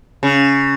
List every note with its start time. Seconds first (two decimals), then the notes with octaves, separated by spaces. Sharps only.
0.23 C#3